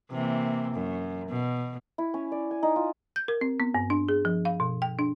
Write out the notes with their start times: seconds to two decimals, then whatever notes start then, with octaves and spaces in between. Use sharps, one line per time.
0.11 C3 E3 A#3
0.74 F#2
1.29 B2
1.98 E4
2.14 C#4
2.32 D5
2.51 G#5
2.63 D#4
2.76 F4
3.16 G6
3.28 A#4
3.41 C4
3.60 B3
3.75 G2
3.90 D4
4.09 G#4
4.25 F3
4.45 F5
4.60 B2
4.82 G5
4.99 D4